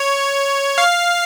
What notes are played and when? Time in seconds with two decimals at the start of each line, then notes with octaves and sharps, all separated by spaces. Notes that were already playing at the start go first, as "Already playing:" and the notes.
Already playing: C#5
0.78 F5